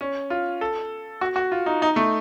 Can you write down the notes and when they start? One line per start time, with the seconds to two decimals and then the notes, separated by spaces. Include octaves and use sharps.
0.01 C#4
0.30 F4
0.61 A4
1.21 F#4
1.36 F#4
1.52 F4
1.66 D#4
1.82 D#4
1.96 A3